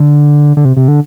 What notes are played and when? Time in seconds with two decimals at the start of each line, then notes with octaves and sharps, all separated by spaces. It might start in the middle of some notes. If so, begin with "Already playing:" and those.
Already playing: D3
0.57 D3
0.65 C3
0.77 C3
0.88 D3